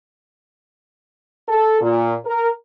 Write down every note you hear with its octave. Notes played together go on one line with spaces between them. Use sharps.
A4
A#2
A#4